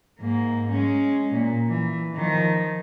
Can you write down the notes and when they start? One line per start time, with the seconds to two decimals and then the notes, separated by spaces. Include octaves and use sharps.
0.19 G#2 A#3
0.71 G#3 C#4
1.33 A#2
1.69 E3
2.15 D#3 F3